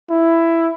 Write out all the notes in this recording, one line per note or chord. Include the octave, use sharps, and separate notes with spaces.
E4